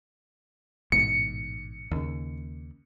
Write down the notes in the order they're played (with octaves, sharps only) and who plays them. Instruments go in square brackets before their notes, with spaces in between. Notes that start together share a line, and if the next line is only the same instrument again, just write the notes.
[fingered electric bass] A1 G#2 B2 [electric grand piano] C#7
[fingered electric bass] D#2 C#3